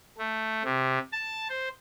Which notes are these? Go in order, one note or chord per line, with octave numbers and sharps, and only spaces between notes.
A3
C3
A5
C5